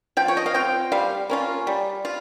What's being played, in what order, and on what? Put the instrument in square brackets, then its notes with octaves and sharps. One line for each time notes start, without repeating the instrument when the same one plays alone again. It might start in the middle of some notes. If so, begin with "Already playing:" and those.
[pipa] F3 G5
C#5
D#5
F5
C4 F4 G5
G3 F5
A#3 C#4 F4
G3
F4